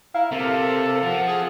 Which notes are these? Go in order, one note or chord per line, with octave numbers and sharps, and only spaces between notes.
E4 F5 A#5
C3 A4 A#4
F3 F#5
G#4